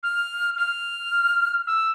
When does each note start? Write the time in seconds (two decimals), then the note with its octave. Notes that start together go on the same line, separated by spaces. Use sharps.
0.03 F6
0.57 F6
1.67 E6